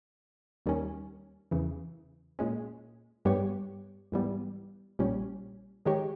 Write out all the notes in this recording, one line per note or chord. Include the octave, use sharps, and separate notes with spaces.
D#2 D#3 G3 C#4
E2 C#3 E3
A#2 G#3 C#4
G2 G3 B3 G4 C#5
G#2 E3 G3 B3
A#1 A#2 G3 C#4
D#3 G#3 D#4 G4 C#5